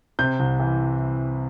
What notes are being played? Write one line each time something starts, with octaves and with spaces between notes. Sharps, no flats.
C3 G6
C2
E3